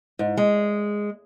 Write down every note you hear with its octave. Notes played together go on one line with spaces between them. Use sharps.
G#2
G#3